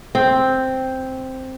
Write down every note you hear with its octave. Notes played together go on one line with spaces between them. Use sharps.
C4